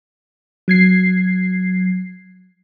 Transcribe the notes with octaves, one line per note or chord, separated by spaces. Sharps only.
F#3 G#6 C7